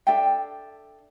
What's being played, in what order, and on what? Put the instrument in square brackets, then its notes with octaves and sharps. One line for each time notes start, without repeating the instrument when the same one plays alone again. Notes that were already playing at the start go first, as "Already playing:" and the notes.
[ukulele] D4 A4 E5 G5